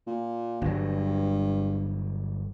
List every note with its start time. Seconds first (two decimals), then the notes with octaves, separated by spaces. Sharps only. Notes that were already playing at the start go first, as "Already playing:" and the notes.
0.07 A#2
0.61 G1 G2 F#3